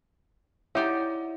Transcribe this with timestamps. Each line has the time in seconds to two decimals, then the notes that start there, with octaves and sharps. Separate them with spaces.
0.75 D#4 E4 G4 C#5 D5 E5 F#5